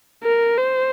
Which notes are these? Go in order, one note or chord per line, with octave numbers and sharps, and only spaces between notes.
A#4
C5